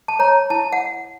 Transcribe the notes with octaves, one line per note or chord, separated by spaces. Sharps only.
A5
C#5 A#5
E4 A5
F#5